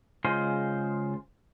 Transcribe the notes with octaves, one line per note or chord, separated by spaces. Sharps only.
C#3 G#3 F4 C5